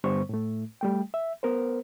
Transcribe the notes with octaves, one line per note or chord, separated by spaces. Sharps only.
G2 D3 G3 B3 C5 C#6
A2 A3
G3 A3 G5
E5
B3 A#4 C5